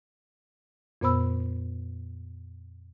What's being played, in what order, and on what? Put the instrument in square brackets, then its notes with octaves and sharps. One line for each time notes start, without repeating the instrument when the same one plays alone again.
[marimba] F2 A#2 B3 C5 B5 E6